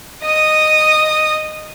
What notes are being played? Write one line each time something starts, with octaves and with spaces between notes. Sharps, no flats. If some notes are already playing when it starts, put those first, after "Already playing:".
D#5 D#6